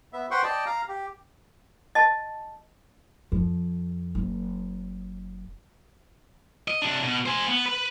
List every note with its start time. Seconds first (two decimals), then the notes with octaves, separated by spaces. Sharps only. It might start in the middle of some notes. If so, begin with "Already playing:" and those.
0.13 B3 E5
0.31 B4 C5 F#5 G5 C6 C#6
0.44 D5 D#5 G5 A5
0.66 F5 A#5
0.88 G4
1.95 D#5 A5
3.32 F2
4.15 F#1
6.68 D#5
6.82 C3 D4
7.03 B2
7.26 C5 G#5
7.48 B3
7.66 B4